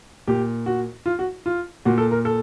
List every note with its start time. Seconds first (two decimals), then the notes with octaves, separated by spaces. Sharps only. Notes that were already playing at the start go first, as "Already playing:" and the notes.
0.27 A#2 G4
0.66 F#4
1.06 F4
1.19 F#4
1.46 F4
1.85 A#2 F#4
1.98 A4
2.11 A#4
2.25 A4